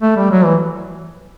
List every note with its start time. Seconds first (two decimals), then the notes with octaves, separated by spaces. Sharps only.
0.02 A3
0.16 G3
0.31 F#3
0.45 E3